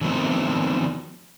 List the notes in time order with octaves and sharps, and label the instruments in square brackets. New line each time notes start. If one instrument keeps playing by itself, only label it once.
[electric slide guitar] D#3 F3 F#3 A3 B3 C4